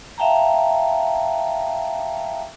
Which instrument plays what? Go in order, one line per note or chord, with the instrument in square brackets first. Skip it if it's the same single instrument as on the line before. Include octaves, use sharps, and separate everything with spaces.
[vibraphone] E5 F5 G5 A5 A#5